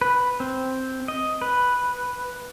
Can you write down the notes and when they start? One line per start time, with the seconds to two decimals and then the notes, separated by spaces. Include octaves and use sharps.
0.01 B4
0.40 C4
1.08 D#5
1.41 B4